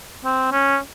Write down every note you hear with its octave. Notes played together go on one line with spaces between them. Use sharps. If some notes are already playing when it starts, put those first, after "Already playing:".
C4
C#4